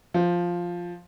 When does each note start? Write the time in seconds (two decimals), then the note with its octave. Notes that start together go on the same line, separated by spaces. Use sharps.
0.14 F3